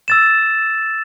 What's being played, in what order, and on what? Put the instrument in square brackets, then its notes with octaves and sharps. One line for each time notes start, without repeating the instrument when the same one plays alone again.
[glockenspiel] E6 A6 E7